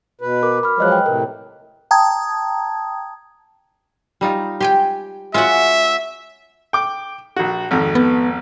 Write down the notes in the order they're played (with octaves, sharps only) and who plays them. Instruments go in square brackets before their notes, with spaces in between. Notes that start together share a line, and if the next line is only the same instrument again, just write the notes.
[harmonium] B2 B4
[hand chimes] A#4 D6
B5 F6
[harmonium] F3 F#3 G#3 [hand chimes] B4 D#5 F#6
[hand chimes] G5
[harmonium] A2 C3 [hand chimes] A#4
[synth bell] G5 A5 A#5 D#6 G#6
[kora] G3 D#4 F4
[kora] G4 [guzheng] G5 G#5 C6
[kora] G#3 C#4 F#4 [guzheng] F4 F#5 [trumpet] E5
[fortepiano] G5 D6
A#1 F#4
G#1 F2
[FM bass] B3